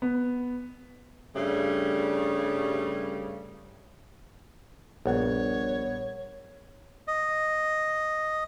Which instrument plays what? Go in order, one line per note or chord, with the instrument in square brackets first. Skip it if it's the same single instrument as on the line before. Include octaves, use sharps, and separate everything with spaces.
[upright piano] B3
[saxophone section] G2 C#3 G3 A3
[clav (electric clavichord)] A#1 [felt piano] G2 B3 F#5 [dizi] C#5
[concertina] D#5